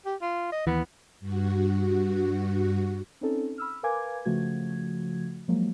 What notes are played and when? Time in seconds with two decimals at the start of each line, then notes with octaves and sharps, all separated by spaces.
0.05 G4
0.21 F4
0.52 D#5
0.67 D#2 E3 B3
1.20 G2 F#4
3.21 C4 C#4 D#4 A4
3.58 B5 E6 F6
3.83 A#4 B4 F5 G#5 D6 G#6
4.25 C#3 F3 A3 F#4 G#6
5.48 F3 F#3 G#3 A#3